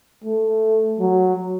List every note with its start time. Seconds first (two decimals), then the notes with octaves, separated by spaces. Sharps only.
0.24 A3
0.99 F#3